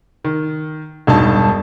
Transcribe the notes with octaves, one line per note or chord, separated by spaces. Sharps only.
D#3
E1 G2 D#4 A5